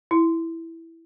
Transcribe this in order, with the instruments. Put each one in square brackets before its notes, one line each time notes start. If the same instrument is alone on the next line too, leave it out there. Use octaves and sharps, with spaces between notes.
[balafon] E4